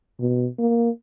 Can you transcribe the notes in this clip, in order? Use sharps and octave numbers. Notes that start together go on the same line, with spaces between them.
B2
A#3